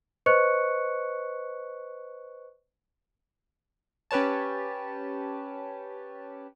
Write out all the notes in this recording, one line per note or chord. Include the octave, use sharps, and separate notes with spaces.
B4 C5 D#5 C#6 F#6 C#7
C#4 G4 B4 C#5 A5